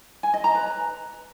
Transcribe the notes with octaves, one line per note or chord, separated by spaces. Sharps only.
G#5
D#5
A#5
B4